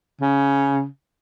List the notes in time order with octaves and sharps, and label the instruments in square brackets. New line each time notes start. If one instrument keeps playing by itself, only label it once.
[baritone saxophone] C#3